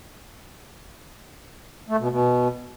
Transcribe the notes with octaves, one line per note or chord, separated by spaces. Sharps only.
A3
B2
B2